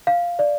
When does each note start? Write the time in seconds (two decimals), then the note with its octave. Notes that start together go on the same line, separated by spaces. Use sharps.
0.07 F5
0.39 D5